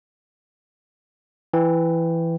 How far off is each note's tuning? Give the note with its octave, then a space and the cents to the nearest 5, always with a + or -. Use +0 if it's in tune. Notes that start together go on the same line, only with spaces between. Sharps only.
E3 +10 G5 +0